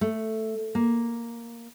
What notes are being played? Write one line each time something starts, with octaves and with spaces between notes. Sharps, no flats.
A3
A#3